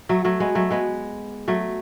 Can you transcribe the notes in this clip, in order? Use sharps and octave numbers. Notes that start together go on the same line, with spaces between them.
F#3 A3
F#3 A3
G#3 B3
F#3 A3
G#3 B3
F#3 A3